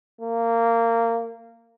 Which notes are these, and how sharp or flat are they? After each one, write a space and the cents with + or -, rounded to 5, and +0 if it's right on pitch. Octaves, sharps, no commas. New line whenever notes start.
A#3 -20